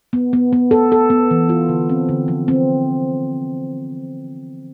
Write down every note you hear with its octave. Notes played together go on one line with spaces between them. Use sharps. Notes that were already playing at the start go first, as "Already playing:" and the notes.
B3
B3
B3
A4
A4
B3
E3
F4
D3
C4
D3
F3
C4